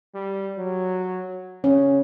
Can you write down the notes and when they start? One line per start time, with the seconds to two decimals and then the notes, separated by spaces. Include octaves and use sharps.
0.14 G3
0.58 F#3
1.64 C#3 C#4